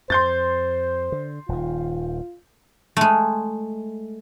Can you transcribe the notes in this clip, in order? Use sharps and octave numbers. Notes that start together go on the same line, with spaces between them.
F2 C5 C6 G6 A6
D3
D#1 D#3 F4
G#3 A3